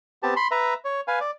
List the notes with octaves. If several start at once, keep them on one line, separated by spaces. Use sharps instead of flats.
B3 C4 G4 A5
B5 C6
B4 E5 A#5
C#5
B4 F5 G#5
D5